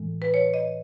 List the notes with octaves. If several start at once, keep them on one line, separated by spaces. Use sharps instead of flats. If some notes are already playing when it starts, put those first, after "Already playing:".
Already playing: A2 E3 G#3
B4
C#5
D#5